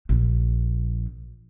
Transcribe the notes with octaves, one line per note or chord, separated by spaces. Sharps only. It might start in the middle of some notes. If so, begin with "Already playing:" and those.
A#1